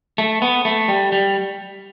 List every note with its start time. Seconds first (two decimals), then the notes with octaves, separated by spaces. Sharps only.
0.18 A3
0.42 B3
0.65 A3
0.88 G3
1.12 G3